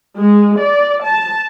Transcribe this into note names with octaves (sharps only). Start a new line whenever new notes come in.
G#3
D5
A5